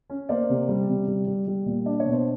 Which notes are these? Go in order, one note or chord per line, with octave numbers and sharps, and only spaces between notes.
C#4
A#3 C5 D5
C3
G3
C3
G3
G3
G3
A#2
D4 D5
C#5
B2
C5